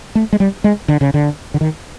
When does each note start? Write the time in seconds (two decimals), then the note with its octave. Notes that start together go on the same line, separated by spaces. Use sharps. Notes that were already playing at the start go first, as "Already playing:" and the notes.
0.15 A3
0.33 G#3
0.40 G3
0.64 G#3
0.88 D3
1.01 C#3
1.14 D3
1.54 D3
1.61 D#3